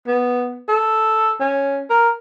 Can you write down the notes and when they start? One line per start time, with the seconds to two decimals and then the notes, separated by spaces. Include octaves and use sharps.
0.07 B3
0.68 A4
1.40 C#4
1.90 A#4